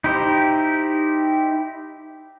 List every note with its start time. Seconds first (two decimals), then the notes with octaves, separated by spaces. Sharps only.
0.04 D#4 E4 G4 C5